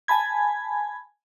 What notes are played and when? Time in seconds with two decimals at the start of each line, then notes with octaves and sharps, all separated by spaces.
0.08 G#5 A5 B5 G#6